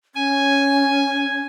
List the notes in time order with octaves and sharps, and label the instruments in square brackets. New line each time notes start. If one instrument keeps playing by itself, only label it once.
[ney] C#4 [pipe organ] G#5